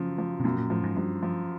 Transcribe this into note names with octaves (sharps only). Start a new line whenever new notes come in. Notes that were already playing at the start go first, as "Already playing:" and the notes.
Already playing: F#2 C#3 F3
F3
C3
F#2 B2
A#2
A2 F3
G#2
G2 F3
F3